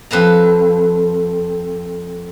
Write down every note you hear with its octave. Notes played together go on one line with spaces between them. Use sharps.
F2 B4 A5 A#5